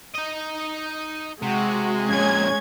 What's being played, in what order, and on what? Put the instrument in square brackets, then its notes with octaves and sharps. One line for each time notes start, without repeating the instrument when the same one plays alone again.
[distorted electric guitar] D#4 D#5
[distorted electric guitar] C3 [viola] G#3 [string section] F#4
[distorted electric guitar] F2 A#2 [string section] C#4 G#6